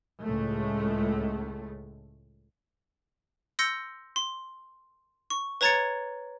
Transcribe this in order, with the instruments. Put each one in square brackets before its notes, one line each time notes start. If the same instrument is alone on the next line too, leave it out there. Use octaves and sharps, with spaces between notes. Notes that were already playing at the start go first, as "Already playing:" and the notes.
[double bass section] C#2 A2 G#3 A3
[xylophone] C6 E6 G6 A#6 C#7
C6
C#6
B4 C#5 A#5 G#6 A6 C#7